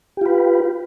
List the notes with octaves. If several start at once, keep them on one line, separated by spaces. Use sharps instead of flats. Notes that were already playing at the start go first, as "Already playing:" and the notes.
F4 G4 B4